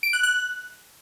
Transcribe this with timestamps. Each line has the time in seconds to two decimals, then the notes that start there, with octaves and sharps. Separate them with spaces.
0.03 D7
0.13 F#6
0.23 F#6